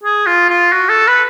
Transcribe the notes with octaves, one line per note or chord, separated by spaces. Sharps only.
G#4
F4
F4
F#4
A4
B4